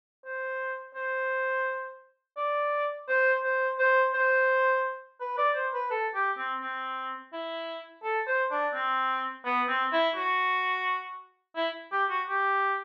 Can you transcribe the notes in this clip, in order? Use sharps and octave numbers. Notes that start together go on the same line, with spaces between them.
C5
C5
D5
C5
C5
C5
C5
B4
D5
C5
B4
A4
G4
C4
C4
E4
A4
C5
D4
C4
B3
C4
E4
F#4
E4
G4
F#4
G4